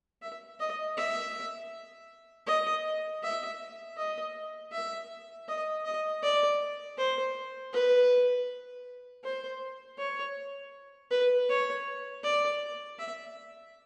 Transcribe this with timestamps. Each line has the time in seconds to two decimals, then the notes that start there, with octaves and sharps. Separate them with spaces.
0.22 E5
0.60 D#5
0.97 E5
2.47 D#5
3.23 E5
3.97 D#5
4.72 E5
5.48 D#5
5.85 D#5
6.23 D5
6.97 C5
7.73 B4
9.23 C5
9.98 C#5
11.11 B4
11.49 C#5
12.24 D5
12.99 E5